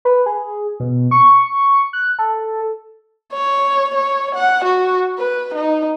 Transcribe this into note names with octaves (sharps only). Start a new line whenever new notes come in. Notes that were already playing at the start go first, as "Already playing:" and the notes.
B4
G#4
B2
C#6
F#6
A4
C#5
C#5
F#5
F#4
B4
D#4